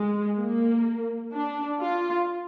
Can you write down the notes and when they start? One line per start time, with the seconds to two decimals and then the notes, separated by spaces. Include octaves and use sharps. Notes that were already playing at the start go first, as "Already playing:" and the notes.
Already playing: G#3
0.39 A#3
1.33 D4
1.80 F4